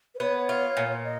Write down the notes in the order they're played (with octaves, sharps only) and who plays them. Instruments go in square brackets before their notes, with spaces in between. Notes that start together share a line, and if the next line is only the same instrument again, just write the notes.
[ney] B4
[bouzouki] B3 [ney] C#5
[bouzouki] F4
A#2
[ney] D#5